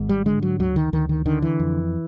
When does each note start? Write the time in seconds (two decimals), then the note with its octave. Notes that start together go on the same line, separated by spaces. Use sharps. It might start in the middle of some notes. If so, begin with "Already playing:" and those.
Already playing: G#1 G#2
0.09 G3
0.26 D3 G#3
0.42 F#3
0.59 D2 F#3
0.76 D#3
0.93 D2 D#3
1.09 D#3
1.26 D3 D#3
1.42 E3
1.60 F2